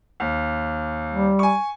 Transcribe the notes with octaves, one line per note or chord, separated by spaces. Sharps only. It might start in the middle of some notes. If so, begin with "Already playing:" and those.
D#2
G3
G#5 C#6